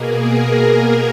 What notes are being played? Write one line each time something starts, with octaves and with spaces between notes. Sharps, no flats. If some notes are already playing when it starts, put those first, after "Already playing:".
Already playing: B2 A#3 G#4
A#4